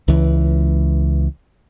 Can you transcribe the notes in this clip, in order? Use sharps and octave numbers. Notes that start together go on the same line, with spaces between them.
C#2 E3